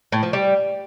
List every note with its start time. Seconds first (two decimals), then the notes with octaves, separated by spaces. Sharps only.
0.12 A2
0.23 F3
0.33 G3